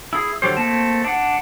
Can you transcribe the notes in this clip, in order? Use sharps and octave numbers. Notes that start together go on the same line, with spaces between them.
E4 G#4
D3 F#3 G4 C5
A3 A#3 C4 A5
D4 F#5